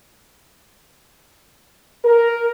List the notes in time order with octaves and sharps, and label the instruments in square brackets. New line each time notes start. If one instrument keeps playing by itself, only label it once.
[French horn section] A#4